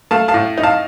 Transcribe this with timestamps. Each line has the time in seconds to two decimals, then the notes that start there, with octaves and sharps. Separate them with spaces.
0.11 A3 F5 A5
0.28 F5 A5
0.34 A2
0.58 D#4
0.63 F5 A5